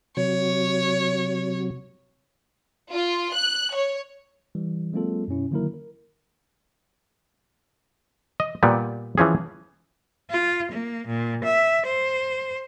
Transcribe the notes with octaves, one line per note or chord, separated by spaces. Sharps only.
C3 F#3 C#5
F4
F#6
C#5
E3 G3
F#3 G#3 A#3 C4 F4 A4
F#2 B2 C#4 E4
D3 D#3 F#3 A#3 E4 A#4
A#4
D#5
A#2 G3 B3
E3 F3 C#4 G#4
F4
A#3
A#2
E5
C5